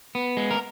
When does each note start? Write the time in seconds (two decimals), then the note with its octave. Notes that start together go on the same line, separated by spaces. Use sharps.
0.15 B3
0.37 G#3
0.51 A#4